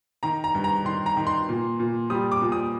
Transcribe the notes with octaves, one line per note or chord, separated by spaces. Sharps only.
D#3 A#5
A#5
G2
A#5
D#3 C6
A#5
D#3
C6
A#2
A#2
G3 D#6
D6
A#2
D#6